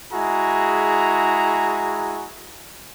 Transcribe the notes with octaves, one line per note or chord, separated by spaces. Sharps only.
G#3 E4 F#4 G#4 A#5